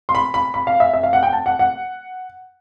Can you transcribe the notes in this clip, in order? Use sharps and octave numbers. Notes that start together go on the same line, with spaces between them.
C6
B5
B5
B5
F5
E5
E5
F5
F#5
G5
A5
F#5
F#5